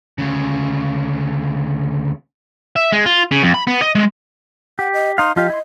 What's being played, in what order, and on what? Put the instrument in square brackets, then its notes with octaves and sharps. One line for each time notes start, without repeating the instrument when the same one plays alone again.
[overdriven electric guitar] D2 C#3
[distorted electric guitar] E5
G#3
F4
C#3
F2
B5
B3
D#5
G#3
[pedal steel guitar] G4 [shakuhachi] F#5
[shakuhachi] D#5
[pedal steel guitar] D#4 F5 [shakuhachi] C6
[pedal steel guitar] F3 F4 G4 [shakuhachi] D#5
[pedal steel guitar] E4 C6